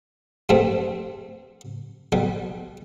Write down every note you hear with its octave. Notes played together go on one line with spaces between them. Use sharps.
G2 C3 A3 C4
B1 G3